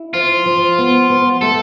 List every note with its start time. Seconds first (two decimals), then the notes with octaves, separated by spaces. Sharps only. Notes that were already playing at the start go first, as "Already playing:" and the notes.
Already playing: E4
0.14 F3 F4
0.46 F3
0.78 B3
1.10 B3
1.41 A3 A4